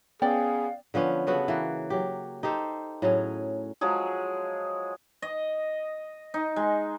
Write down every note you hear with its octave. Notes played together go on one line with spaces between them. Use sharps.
B3 C#4 G#4 D5 F5 G5
D3 F3 B3 C#4
C#3 B3 F#4 A4
E3 A#3
F#3 G4
D#4 G4 A4 C5
A2 F#3 C#4 G#4
F3 F#3 G#3 G#4
D#5
D#4
G#3